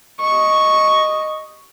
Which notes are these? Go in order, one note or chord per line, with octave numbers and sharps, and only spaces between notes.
D#5 C#6